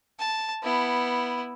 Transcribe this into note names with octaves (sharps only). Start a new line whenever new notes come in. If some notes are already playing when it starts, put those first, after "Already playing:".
A5
B3 E4